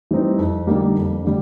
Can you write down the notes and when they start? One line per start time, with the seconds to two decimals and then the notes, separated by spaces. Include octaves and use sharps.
0.11 E3 G3 C4 D#4
0.38 F2
0.67 D3 G3 A#3 D#4
0.96 F2
1.24 D3 G3